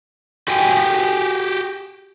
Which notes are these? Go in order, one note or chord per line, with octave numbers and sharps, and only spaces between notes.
F#4 G4 G5 G#5